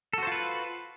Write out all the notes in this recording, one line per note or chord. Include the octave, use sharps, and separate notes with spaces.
F4 F#4 A4 B4 C5